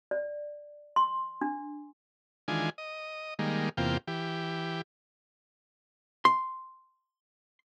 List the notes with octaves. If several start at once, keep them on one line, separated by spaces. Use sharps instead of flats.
D5
C6
D4
D#3 E3 G#3 D4 F4 G#5
D#5
D#3 G3 G#3 A#3
E2 C3 A#3 F4 G5
E3 G4
C6